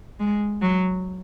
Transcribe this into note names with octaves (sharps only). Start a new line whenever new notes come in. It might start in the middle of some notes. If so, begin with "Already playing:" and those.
G#3
F#3